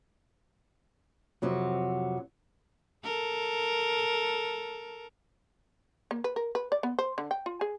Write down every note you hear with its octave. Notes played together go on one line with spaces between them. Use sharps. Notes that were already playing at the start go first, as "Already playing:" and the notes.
F2 C3 F#3
A4 A#4
A#3
B4
A#4
B4
D5
B3
C5
D3
G5
F4
G#4